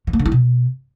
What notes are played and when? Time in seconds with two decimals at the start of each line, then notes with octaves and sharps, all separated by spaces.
0.07 E3
0.13 A#3
0.19 D3
0.26 E4
0.32 B2